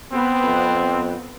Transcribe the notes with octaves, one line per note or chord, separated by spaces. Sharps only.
B3 C4
F2